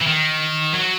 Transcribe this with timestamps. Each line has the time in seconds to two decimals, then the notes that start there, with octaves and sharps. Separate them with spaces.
0.02 E3
0.07 D#3
0.74 F#3